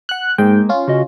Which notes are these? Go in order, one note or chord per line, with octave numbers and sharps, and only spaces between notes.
F#5 F#6
G#2 G#3 A#3 G5
C#4 F4
C#3 F#4 D#5